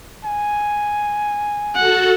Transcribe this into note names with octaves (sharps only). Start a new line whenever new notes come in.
G#5
F#4 A4 F#5